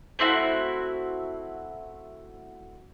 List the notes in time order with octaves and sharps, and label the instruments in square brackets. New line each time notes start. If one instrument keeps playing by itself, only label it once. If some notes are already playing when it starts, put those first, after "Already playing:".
[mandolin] A3 C4 E4 F#4